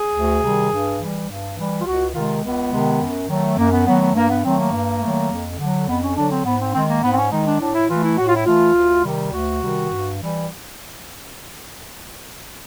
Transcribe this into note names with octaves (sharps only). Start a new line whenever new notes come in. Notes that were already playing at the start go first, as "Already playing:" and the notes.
Already playing: G#4
D2
C3 D#3 G3
G2
E3 G3
G2
E3 G3
F4
C#2 F#4
C3 D#3 G#3 F4
C#2 B3
C3 D#3 G#3
F#2
D#3 F#3 A3
F#2 A#3
B3
D#3 F#3 A3 B3
B3
G2 A#3
B3
D#3 F#3 A3 C4
A#3
G2
D#3 F#3 A3
F2
D3 F#3
F2 B3
C#4
D3 F#3 D4
C4
G#2 B3
C4
D#3 G#3 C4
A#3
G#2 B3
C4
C#4
D#3 G#3 D#4
D4
A2 D4
E4
E3 A3 F4
E4
A2 F#4
F4
E4
E3 A3 F4
D2
C3 D#3 G3
D2 F#4
C3 D#3 G3
G2
E3 G3